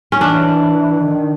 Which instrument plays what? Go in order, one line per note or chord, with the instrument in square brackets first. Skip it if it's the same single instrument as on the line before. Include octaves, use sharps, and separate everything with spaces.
[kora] C#4
[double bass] E3 [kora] D4
[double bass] D#3